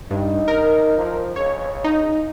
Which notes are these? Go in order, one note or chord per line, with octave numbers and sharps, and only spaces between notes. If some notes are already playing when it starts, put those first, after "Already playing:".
G2 D#4
A#4
F3
C#3 C#5
D#4